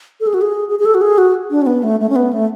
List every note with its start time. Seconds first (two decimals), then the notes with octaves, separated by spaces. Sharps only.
0.20 A4
0.27 G#4
0.34 F#4
0.41 G#4
0.69 G#4
0.79 G#4
0.85 A4
0.94 F#4
1.02 G#4
1.18 F#4
1.51 D4
1.62 C#4
1.66 B3
1.83 A3
2.00 A3
2.09 C#4
2.16 B3
2.33 A3